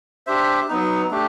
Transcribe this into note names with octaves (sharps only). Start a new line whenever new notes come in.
D4 G4 C5 E5
F#3 B3 D#4
A3 D4 G4